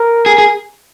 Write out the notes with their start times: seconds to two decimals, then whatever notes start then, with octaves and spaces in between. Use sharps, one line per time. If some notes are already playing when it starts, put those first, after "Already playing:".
Already playing: A#4
0.26 G#4
0.38 G#4